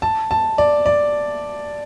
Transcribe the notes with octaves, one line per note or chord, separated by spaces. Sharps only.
A5
A5
D5
D5